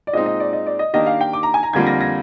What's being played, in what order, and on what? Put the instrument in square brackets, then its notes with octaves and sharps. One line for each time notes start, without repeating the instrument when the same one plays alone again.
[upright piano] D5
[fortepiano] A#2 G#3 C4 D#4 [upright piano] D#5
[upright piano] D#5
D5
D#5
D5
D#5
[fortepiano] D#3 A#3 D4 G4 [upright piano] D#5
[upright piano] F5
G5
D6
A#5
G#5
A#5
[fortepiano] F2 D3 G3 A#3 F4 [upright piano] G#6
[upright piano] A#6
A#6